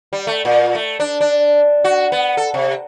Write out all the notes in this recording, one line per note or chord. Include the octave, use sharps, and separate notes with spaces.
G3
A3
A#2
A3
D4
D4
F#4
B3
A4
C3